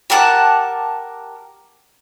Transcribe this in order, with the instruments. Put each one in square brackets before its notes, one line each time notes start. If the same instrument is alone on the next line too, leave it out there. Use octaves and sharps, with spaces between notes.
[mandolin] G4 A#4 F#5 A5